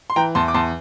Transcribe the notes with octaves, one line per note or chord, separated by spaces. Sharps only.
C6
E3 G5 A#5
E2 A5 C6
D6
E2 A5 C6